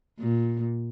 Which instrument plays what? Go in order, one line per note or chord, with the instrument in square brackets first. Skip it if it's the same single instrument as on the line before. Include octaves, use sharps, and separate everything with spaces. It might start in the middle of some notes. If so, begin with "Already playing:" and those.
[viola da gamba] A#2